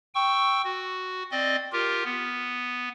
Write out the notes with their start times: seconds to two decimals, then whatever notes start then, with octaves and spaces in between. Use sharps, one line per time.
0.15 G5 C#6 E6
0.64 F#4
1.31 C4 D5 D#5
1.72 F4 G4 A#4
2.04 B3